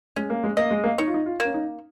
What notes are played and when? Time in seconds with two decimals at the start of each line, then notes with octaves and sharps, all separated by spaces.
0.16 G#3 C#4
0.30 A#3
0.44 G#3
0.57 A#3 D#5
0.71 G#3
0.84 A#3
0.98 D#4 C#5
1.07 F4
1.14 D#4
1.26 F4
1.40 A#3
1.45 C#4
1.54 D#4